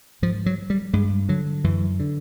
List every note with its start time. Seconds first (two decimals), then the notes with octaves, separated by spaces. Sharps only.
0.22 G#2 F3
0.46 F#3
0.70 G3
0.93 G2 G#3
1.29 D3 F#3
1.64 F#2 E3
2.00 D3